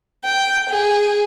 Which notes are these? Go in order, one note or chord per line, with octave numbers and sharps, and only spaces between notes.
G5
G#4